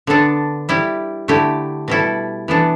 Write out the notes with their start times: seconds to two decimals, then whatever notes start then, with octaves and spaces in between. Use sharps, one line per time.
0.07 D3 B3 D4 A4
0.69 G3 E4 G4
1.28 D3 A3 E4 G4
1.88 B2 G3 E4 A4
2.48 E3 B3 D4 A4